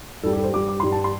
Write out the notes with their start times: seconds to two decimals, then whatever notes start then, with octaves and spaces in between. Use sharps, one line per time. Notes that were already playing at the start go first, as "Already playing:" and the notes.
0.23 G2 G3 A4
0.33 G4
0.39 A4
0.43 C5
0.53 G2 G3 D6
0.68 D6
0.80 G2 G3 C6
0.92 A5
1.04 C6